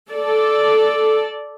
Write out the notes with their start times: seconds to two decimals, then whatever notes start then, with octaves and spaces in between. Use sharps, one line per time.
0.10 A4 D5